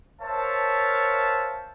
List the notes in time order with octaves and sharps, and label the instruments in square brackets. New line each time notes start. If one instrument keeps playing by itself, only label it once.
[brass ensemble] A#4 C5 C#5 E5 F5 A5